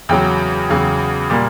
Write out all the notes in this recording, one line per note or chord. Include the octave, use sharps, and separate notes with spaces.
E2 C#3 F#3 G5
E2 C#3 F#3
A#2 G3 A#3